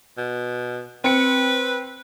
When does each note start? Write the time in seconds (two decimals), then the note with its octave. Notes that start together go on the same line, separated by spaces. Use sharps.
0.17 B2
1.04 C4 B4 C#7